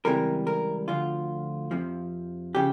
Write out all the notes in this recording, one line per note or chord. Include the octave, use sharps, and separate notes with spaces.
C#2 C3 E3 G3 A#4
A#4
D2 D3 F3 F4
F2 C3 F3
C#3 F3 G4